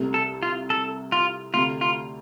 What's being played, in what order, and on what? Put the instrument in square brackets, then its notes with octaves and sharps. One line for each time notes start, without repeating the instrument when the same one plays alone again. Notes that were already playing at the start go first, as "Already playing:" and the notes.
Already playing: [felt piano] C2 C3 A3
[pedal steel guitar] A4
F4
A4
F4
[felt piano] D2 C3 A3 [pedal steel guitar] F4
[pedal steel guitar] F4